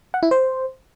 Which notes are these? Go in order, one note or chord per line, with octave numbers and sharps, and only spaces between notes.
F#5
E4
C5